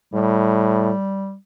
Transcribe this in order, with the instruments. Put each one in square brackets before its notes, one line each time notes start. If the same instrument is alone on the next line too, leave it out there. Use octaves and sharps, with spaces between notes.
[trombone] A2 [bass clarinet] G3